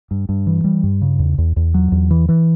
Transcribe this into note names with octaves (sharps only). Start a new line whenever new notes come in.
G2
G2
E3
G3
G2
C#3
E2
E2
E2
F#3
E2
E3
E3